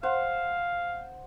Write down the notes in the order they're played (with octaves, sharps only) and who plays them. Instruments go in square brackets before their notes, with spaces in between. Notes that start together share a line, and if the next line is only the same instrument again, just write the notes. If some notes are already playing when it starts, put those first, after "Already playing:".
[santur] C5 F#5 [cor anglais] F5